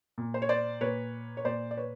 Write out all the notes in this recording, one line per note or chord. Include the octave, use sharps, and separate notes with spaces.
A#2
C5
C#5
C5 D5
A#2 B4 C#5
C#5
A#2 C5 D5
D5
B4 C#5